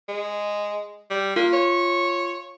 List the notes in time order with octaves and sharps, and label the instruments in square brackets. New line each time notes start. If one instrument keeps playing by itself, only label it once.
[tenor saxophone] G#3
G3
[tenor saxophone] A#3 [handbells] F4
[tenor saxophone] C#5